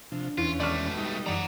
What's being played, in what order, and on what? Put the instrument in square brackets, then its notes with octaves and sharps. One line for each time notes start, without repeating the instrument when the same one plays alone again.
[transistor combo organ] C3 F3 [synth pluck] D4
[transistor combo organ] E2 C#4 [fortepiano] E3 [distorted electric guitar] F4
[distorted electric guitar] B2 A3 [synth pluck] D#3 G#3 [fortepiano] D5 C#6 F6
[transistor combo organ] G3 D#4
[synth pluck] F#2 E3 [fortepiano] D5 [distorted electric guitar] F#5 A#5